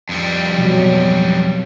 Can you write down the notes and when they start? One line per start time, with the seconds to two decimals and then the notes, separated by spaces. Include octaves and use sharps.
0.09 F2 G3
0.58 B2 F#3